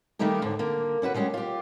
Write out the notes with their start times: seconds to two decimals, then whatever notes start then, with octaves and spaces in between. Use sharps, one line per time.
0.19 D#3 G3 A3 A#3 D#4 G4
0.42 D#2 G#2 D3
0.59 D3 A#3
1.02 C#4 E4 F#4 B4
1.14 G3 G#3 C#4 E4 F#4
1.34 F4 G4